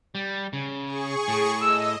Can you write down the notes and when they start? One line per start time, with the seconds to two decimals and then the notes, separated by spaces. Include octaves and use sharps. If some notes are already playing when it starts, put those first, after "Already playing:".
0.15 G3
0.53 C#3
0.86 G#4 C#6
1.28 A2
1.60 D#5 E6